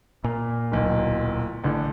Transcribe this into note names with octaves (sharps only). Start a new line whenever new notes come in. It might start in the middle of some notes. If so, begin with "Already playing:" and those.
A#2
D1 B1
A1 D3